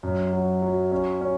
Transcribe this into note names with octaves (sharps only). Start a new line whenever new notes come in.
F#2
F#3
F#3
C#4
C#4